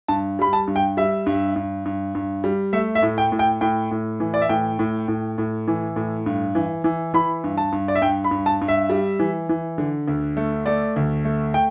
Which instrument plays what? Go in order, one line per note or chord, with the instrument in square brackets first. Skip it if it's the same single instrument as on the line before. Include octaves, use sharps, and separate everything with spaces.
[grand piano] G2 A5
G3 B5
A5
G2
G5
G3 E5
G2
G2
G2
G2
G3
A3 E5
E5
A2
G5
A2
G5
A2 G5
A2
E3
D5
E5
A2 G5
A2
A2
A2
E3
A2
G2
E3
E3
E3 B5
G2
A5
G2
D5
E5
G2 G5
B5
G2
A5
G2
E5
G3
E3
E3
D3
D2
A3
A3 D5
D2
A3
G5